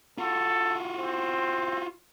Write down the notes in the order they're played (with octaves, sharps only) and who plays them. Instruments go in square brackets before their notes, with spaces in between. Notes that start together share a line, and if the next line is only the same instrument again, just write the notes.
[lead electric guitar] F4 F#4 [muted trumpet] A4
[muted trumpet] C4